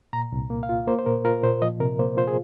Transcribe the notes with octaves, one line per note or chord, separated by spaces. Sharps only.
A#2 A#5
C2
A#3
F5
F4
A#3 C5
C5
A#2 A#4
F4 A#4
A#2 C5
F3 D#5
C3 A#4
A#3 C5
F4 C5
G#4